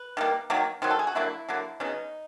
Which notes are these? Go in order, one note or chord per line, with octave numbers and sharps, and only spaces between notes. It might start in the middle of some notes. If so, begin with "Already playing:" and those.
Already playing: B4
D#3 G3 A#3
D#3 F#3 A#3
D#3 F#3 C5
A4
G#4
F#4
D3 F#3 A#3 E4
D3 F#3 A#3
C#3 F#3 B3 D#4